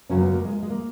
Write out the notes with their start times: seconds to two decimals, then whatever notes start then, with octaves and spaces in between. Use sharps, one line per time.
0.09 F#2 C#3 F#3 C#4
0.17 A#3
0.22 B3
0.34 A#3
0.45 G#3
0.63 G#3
0.70 A#3